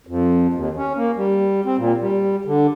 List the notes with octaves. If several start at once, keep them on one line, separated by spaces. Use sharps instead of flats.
F2
D#2
C#4
A#3
G3
C4
A#2
G3
D3